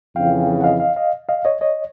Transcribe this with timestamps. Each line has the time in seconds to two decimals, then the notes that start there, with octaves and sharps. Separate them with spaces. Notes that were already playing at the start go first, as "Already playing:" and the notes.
0.16 F2 C#3 E3 F5 G5
0.60 F#5
0.64 D#5 F5
0.80 D#5 F5
0.96 D#5 F5
1.29 D#5 F5
1.45 C#5 D#5
1.61 C#5 D#5